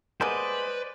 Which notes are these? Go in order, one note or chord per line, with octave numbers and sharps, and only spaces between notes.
G3 G#3 A#3 B3 B4 C5 D5 D#5